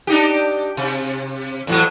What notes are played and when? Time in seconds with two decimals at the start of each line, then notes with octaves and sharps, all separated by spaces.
0.07 D4 D#4 G4
0.77 C3
1.67 E2 A2 F#3